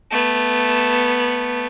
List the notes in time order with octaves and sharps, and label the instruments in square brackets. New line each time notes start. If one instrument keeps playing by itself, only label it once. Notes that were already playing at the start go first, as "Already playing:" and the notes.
[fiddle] A3 B3